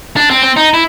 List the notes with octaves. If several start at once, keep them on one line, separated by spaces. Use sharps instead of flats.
D4
C4
C4
D#4
E4